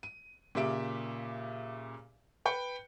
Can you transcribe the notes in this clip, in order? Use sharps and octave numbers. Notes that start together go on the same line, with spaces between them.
D#7
A#2 C#3 G4 E5 D7
B4 G5 C#7